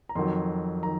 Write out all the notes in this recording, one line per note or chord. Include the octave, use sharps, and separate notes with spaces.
A#5
F2 D#3 F#3 C6
D#3 A#5